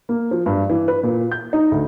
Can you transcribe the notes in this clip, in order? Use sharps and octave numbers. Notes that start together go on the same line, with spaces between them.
A#3
F3
G2
E3
B4
A#2
G6
D#4
D2